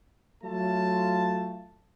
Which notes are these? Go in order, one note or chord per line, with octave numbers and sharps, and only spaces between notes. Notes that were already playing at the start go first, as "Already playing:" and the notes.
F#3 A3 F4 A5